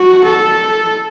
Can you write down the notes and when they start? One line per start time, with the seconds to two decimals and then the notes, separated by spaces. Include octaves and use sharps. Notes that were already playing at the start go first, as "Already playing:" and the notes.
Already playing: F#4
0.24 A4